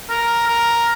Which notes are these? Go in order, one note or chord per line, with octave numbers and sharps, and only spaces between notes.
A#4
A#4